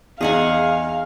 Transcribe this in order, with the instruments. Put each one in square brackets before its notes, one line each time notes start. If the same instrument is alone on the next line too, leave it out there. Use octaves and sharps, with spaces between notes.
[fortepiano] E2 D#4 [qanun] G#4 F#5 G#5 [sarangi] F5